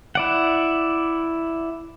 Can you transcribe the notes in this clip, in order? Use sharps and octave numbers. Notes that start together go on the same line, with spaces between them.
E4 D5 F#5